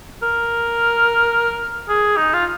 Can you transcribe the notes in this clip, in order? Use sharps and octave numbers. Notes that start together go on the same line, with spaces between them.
A#4
G#4
D#4
F4